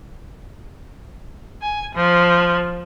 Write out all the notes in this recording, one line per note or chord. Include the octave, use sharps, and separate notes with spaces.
G#5
F3